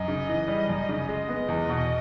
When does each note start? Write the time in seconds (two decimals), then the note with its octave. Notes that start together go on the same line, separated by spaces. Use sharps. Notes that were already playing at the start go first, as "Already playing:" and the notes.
Already playing: F#2 D#5
0.08 C#3
0.29 E3
0.48 G3
0.69 F#2
0.89 C#3
1.08 G#3 D#5
1.29 B3
1.48 E2
1.69 B2